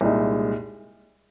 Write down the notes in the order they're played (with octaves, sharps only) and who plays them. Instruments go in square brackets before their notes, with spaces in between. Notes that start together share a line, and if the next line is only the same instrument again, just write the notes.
[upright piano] C2 A#2 G#3 D#4